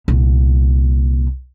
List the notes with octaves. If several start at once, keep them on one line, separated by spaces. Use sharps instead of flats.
C2 A#2